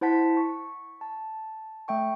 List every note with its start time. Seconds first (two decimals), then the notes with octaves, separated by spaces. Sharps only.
0.01 E4 C5 F#5 A5 B6
0.37 C#6
1.01 A5
1.88 A3 E5 G5 C#6